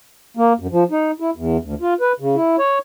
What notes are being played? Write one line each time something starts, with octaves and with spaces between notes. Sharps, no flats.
A#3
F#2
F3
D#4
E4
E2
D2
F4
B4
C#3
E4
C#5